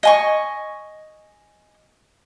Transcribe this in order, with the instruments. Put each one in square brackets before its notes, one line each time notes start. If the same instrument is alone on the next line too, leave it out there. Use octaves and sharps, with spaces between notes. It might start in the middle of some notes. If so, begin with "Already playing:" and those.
[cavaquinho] D#5 G#5 C#6